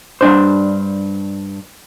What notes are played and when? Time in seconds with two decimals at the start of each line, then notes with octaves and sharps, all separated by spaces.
0.21 G2 D4 C5